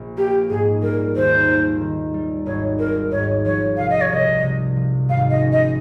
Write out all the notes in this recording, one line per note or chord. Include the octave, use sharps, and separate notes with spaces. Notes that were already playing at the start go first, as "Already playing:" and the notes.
Already playing: A#1
A#3 G4
G#2 G#4
G3 A#4
D#2 C5
A#3
D#3
G3
G#1 C#5
C4 A#4
G#2 C#5
F3 C#5
C2 F5
D#5
C#5
C2 D#5
C3
F3
G#1 F5
D#5
C#4
D#5